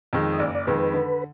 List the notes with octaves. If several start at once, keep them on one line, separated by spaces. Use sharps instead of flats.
F2 D#3 G#3
D#5
F#1 D5
D5
F2 D#3 G#3 B4
D3